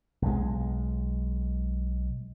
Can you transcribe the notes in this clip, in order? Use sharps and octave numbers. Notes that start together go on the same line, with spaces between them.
B1 G#3